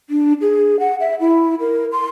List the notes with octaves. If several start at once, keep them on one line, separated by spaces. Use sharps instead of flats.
D4
G#4
F#5
E5
E4
A#4
C6